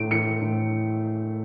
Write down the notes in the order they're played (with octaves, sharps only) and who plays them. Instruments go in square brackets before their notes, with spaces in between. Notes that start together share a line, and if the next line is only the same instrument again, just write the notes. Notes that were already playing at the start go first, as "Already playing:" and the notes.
Already playing: [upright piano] A2 A3 D7
E3 C#7
A2